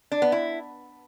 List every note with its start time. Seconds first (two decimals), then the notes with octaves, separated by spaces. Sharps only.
0.12 D4
0.22 B3
0.32 E4